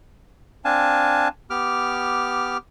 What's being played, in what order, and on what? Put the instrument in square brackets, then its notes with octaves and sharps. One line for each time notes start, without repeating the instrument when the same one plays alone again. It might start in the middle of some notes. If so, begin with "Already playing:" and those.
[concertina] C4 D4 F5 G#5 A5
B3 G4 D6 F6